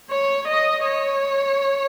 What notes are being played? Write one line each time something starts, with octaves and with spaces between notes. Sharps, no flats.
C#5
D#5
C#5